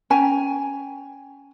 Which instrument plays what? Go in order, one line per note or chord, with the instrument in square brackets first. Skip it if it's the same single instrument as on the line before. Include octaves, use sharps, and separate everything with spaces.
[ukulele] C#4 G5 G#5 A#5